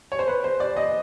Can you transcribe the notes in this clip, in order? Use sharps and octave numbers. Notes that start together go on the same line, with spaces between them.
C#5
C5
B4
C5
D5
D#5